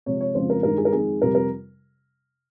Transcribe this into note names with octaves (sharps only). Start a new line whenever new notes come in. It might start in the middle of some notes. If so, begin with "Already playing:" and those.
C3 F3 G#3 C#5
C#5
F2 C#3 F3 G#3 C5
A#4
G2 D#3 G#3 A#4
G#4
A#4
F2 D#3 G#3 G#4
F2 C3 G3 A#4
A#4